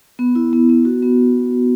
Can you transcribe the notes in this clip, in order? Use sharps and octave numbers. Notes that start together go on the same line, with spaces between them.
B3
E4
B3
B3
F#4
B3